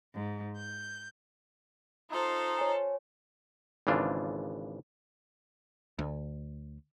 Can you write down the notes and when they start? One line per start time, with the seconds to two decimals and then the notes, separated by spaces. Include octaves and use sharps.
0.13 G#2
0.57 G6
2.10 D#4 F4 A4 C5
2.58 C#5 G#5
3.87 G#1 C#3 E3 D4 F4
5.99 D2